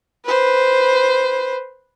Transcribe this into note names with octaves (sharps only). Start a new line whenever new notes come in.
B4 C5